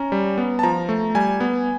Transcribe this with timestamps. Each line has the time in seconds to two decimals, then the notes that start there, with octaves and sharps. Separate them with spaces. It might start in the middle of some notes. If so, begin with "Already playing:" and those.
Already playing: C#4 A#5
0.12 G3
0.38 B3
0.59 A5
0.63 F3 A#5
0.89 A3
1.15 G3 G#5
1.40 B3